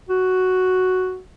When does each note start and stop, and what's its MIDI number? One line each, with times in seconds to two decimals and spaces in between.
0.09 1.19 66